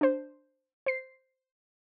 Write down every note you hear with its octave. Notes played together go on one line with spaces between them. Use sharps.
D4 C5
C5 C7